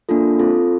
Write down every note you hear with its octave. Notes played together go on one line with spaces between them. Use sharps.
A#3 D4 F4 A4
C4 F4 A4